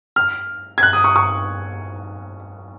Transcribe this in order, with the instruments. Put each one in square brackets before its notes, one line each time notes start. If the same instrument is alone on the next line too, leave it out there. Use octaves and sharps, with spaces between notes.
[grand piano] F6
G#6
F#6
D#6
C#6
C#6